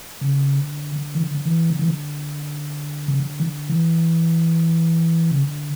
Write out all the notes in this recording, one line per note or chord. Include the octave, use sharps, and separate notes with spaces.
C#3
D3
D3
E3
D3
D3
E3
D3
E3
D3
C#3
D3
E3
D3
E3
C#3
D3